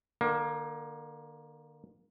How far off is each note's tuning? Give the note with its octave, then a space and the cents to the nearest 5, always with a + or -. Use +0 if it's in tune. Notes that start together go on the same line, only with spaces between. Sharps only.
D3 +45 A#3 +20